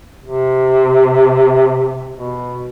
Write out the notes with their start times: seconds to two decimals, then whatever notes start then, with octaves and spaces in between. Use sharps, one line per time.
0.24 C3
2.12 B2